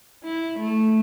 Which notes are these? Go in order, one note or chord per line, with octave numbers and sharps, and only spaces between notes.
E4
A3